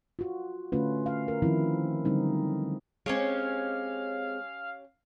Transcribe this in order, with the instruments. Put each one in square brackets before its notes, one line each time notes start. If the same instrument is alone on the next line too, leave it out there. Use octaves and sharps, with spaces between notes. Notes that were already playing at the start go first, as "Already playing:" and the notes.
[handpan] F4 F#4
D3 A3 C#4 F4 B4
F5
A#4
D#3 F3 C4 C#4 E4
D3 F#3 G3 C4 D#4
[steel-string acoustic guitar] G#3 C4 [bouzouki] C#4 G4 C#5 [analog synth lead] F5